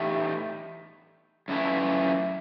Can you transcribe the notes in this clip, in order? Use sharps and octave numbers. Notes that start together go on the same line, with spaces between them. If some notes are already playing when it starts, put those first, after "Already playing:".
Already playing: A2 E3 A3 D#4 G4
F#2 E3 A3 E4